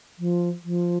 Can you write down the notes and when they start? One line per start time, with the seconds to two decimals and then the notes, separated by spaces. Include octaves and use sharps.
0.19 F3
0.64 F3